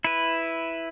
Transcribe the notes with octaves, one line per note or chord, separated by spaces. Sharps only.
E4 B4